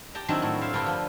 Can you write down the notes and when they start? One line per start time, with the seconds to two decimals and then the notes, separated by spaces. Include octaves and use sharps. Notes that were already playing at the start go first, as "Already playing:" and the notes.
0.15 G4 G5 A5 A#5
0.28 D#3 F#3 C4 D4 E4 F#4
0.42 A2
0.61 C5 E5 F5
0.73 G2 D3 D4 A#4 B4 G5
0.86 F3